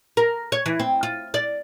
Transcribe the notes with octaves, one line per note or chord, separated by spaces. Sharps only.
A#4
C#5
E3
C4
F4
D5